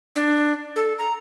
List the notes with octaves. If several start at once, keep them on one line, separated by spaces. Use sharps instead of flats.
D4
A4
A#5